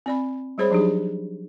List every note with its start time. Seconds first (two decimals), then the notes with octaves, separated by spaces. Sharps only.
0.06 C4 D5 B5
0.58 G3 G#3 G#4 C5 C#5 B5
0.70 F3 F#3 D4 D#4 G4 G#4